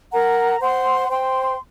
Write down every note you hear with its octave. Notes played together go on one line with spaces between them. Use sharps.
A#4 F#5 A#5
C5 F#5 C6
C5 G5 C6